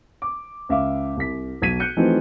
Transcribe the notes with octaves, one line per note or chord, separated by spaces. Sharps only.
D6
C#2 E5 F5 D6
C2 B6
B1 G#6 B6 D#7
F#6 G6 C#7
E3 F3 A3 C4 D#4 F#4